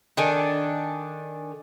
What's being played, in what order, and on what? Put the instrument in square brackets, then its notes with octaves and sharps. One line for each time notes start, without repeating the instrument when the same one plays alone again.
[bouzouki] D#3 D4 A4 G#5